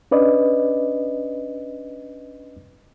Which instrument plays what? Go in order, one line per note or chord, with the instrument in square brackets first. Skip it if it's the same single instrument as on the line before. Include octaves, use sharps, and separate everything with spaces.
[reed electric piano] C#4 D4 B4 D5 D#5